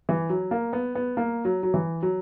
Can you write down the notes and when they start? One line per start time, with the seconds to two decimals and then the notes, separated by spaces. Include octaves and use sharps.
0.09 E3
0.30 F#3
0.51 A#3
0.73 B3
0.95 B3
1.17 A#3
1.45 F#3
1.63 F#3
1.74 E3
2.03 F#3